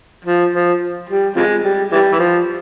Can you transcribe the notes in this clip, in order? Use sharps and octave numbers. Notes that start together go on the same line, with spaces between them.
F3
F3
G3
C3 F3 G#3
G3
E3 G3
E3
F3